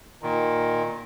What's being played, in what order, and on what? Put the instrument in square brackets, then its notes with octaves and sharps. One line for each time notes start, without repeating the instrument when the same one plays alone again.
[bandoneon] A#2 D#3